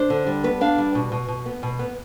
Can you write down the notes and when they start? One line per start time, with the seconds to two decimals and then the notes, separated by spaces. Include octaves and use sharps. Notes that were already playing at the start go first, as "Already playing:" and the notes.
Already playing: D4 C5
0.10 D3
0.27 G3
0.44 B3 B4
0.61 D4 F5
0.78 G3
0.95 B2
1.12 B2
1.28 B2
1.46 B3
1.63 B2
1.79 B3